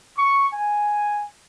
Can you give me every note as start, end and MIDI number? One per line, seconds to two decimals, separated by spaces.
0.17 0.47 85
0.53 1.26 80